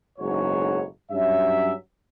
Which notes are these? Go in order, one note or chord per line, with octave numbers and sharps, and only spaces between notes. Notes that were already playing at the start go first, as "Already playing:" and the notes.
F#1 B1 G#2 F#4 C#5
G2 F#3 C#4 E5